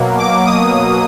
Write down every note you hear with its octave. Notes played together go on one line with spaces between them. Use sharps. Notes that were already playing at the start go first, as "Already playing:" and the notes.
Already playing: B2 F#3 A#3
D6
D#6